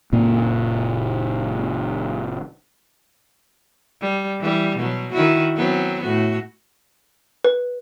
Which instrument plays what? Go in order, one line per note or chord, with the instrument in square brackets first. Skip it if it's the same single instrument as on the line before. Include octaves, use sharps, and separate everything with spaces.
[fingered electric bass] F#1 A#2 A#3
[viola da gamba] G3
E3 G3
B2 F#3
D#3 E4 F#4
F#3 B3 C4
A2 F#4
[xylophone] B4